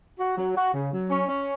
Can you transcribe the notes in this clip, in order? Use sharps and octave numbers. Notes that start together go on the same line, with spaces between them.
F#4
F#3
F#4
C#3
F#3
C#4
C#4